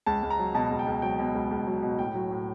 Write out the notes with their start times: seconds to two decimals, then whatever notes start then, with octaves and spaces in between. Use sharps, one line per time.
0.06 C#2 A5
0.23 C#2
0.30 A#5
0.39 F#3
0.54 B2 A5
0.71 C#2
0.79 G5
0.87 C#2
1.02 F#3 G5
1.19 B2
1.34 C#2
1.51 C#2
1.67 F#3
1.83 B2
1.99 A2 G5
2.14 F#3
2.31 A2